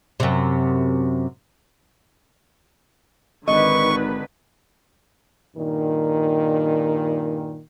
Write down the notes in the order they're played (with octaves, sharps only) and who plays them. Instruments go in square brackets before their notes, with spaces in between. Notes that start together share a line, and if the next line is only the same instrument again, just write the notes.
[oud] F#2 C3
[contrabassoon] G#1 [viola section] D3 D#3 B4 [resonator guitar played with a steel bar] D#5 [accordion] C#6
[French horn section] G2 A#2 D#3